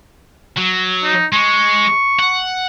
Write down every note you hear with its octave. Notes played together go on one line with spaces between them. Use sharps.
F#3
D#4
G#3 C#6
F#5